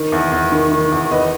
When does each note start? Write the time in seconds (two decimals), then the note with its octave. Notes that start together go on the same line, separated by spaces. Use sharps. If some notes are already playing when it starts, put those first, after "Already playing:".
Already playing: D#3
0.12 E2
0.32 E2
0.52 D#3
0.72 D#3
0.92 E2
1.11 E2 B4 D#5